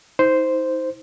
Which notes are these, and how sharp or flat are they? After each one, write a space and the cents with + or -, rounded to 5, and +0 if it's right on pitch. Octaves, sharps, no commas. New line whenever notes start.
D#4 +40 C5 -5